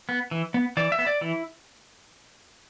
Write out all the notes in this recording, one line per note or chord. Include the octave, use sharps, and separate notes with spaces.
B3
E3
B3
E3 D5
E5
B3
D5
E3 E4